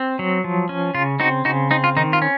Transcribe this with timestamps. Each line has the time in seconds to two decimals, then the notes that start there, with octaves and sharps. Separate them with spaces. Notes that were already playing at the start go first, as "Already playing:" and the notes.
Already playing: C4
0.19 F#3
0.44 F3
0.69 C#4
0.94 C#3 F4
1.20 C4 D#4 F#4
1.45 C#3 D#4 F#4
1.71 C4 D#4
1.84 F4
1.97 D#3 D#4
2.13 F4
2.22 C#4